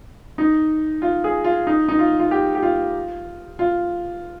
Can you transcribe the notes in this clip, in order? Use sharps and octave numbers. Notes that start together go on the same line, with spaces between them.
D#4
F4
G#4
F4
D#4
D#4
F4
F4
G4
G4
F4
F4